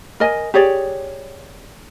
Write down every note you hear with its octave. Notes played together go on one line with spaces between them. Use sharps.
A#4 D#5 G#5
G4 G#4 C#5 D5